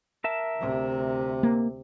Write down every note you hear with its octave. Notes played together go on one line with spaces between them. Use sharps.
A#4 E5 A5
D2 C3
A#3